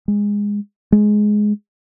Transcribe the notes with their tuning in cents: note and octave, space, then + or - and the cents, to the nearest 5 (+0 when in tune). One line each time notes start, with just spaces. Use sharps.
G#3 -15
G#3 +10